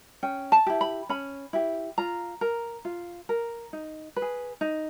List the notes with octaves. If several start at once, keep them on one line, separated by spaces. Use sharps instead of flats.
C#4 G5
A5
E4 G4
B5
C#4 B5
E4 G4
F4 A#5
A#4
F4
A#4
D#4
B4
G#4
D#4